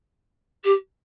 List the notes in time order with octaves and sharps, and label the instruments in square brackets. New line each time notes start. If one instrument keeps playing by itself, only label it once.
[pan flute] G4